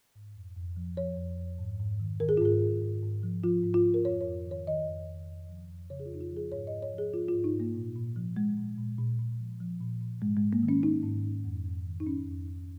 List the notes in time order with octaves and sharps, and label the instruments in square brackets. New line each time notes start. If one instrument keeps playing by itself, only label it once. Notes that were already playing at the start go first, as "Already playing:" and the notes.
[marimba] G#2
F2
F2
F3
F3 C#5
F2
F2
G#2
G#2
D#3
D#3 A#4
G#4
F4
G#2 G#4
G#2
G#2
G#2
F3
F3 F4
G#2
F4
G#2
A#4
F2 C#5
C#5
F2
D#3 C#5
D#3 D#5
F2
F2
F2
F3
F2
C#3 C#5
G#4
F4
F2 D#4
F4
F3
G#4
G#2 C#5
D#5
G#2
C#5
F3
G#4
F3 F4
F4
G#2
D#4
G#2 A#3
A#2
A#2
F3
F3 G#3
A#2
A#2
A#2
A#2
F3
F3
A#2
A#2
G#2 G#3
G#2 G#3
A#3
D#3
C#4
D#3 D#4
G#2
G#2
F2
F2
D#3
D#4
D#3 C#4
F2
F2